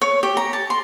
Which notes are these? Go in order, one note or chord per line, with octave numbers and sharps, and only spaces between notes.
C#5
G4
A#5
A5
C6